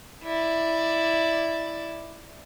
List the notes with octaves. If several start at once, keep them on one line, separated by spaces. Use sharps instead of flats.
E4 D5